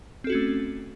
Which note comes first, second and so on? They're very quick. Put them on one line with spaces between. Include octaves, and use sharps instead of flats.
C4 A4 F#4 C#4 A3